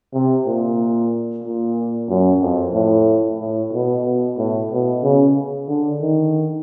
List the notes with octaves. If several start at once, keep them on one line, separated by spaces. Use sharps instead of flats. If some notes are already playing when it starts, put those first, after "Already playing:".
C3
A#2
A#2
F#2
F2
A2
A2
B2
B2
A2
B2
C#3
D3
D#3